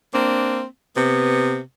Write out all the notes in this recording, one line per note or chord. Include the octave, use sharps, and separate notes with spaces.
A#3 C4 D4
C3 B3